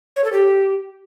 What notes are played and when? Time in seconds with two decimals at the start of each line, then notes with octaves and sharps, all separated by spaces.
0.16 C#5
0.24 A4
0.32 G4